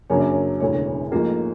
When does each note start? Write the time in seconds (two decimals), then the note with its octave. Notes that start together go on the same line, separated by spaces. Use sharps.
0.10 F#2 C#3 F#3 A#3 D4 C#5
0.20 D5
0.30 C#5
0.60 E1 D2 C#3 E3 C#5
1.12 A1 G#2 F3 A#3